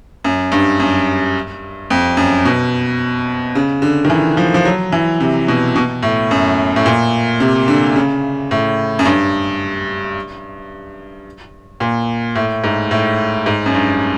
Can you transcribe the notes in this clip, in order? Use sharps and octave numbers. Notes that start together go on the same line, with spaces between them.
F#2
G2
F#2
F2
F#2
B2
C#3
D3
D#3
E3
F3
F3
F#3
E3
C3
B2
B2
A2
F#2
A2
A#2
C3
D3
C#3
A2
F#2
G2
A#2
A2
G#2
A2
G#2
F#2
G2